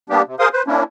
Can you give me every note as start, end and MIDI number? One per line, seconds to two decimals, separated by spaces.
0.10 0.22 55
0.10 0.22 58
0.10 0.22 59
0.10 0.22 62
0.10 0.22 67
0.27 0.35 48
0.39 0.48 68
0.39 0.48 70
0.39 0.48 72
0.39 0.48 77
0.39 0.48 84
0.39 0.48 87
0.53 0.63 71
0.53 0.63 72
0.67 0.83 58
0.67 0.83 61
0.67 0.83 62
0.67 0.83 64